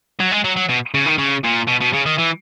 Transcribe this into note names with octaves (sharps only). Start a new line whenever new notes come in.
F#3
G#3
F#3
F#3
B2
C#3
D#3
C#3
A#2
B2
B2
C#3
D#3
E3